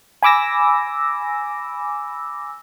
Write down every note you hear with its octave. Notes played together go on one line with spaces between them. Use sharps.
G#5 B5 D6 E6 A#6